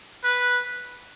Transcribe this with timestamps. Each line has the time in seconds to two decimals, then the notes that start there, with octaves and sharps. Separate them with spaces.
0.24 B4